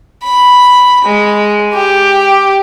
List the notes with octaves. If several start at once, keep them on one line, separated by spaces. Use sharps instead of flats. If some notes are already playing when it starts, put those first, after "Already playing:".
B5
G#3
G4